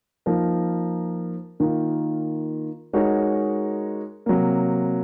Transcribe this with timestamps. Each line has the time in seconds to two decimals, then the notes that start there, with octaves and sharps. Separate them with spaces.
0.26 F3 A#3 D#4 A#4
1.60 D#3 A#3 F4
2.93 G#3 D#4 F#4 A#4 C#5
4.26 C3 F#3 A#3